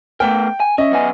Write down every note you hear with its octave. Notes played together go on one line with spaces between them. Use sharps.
A3 B3 A#4 G5
G#5
C#4 D#5 E5
F#2 B3 G#5